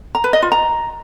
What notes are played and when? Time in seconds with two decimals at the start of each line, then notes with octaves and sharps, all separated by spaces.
0.15 A#5
0.24 B4
0.33 D#5
0.42 F4
0.52 A#5